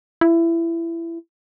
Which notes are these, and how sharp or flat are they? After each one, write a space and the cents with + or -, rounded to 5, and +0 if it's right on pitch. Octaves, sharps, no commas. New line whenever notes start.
E4 +20